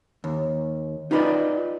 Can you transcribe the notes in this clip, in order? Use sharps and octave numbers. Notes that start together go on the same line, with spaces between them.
D#2
D#4 F4 B4 C5 D5 D#5